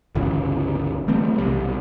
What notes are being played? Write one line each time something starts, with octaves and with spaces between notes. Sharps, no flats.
G1 C#2 C#3 E3
E3 G3 A3 C4
B1 C3 G3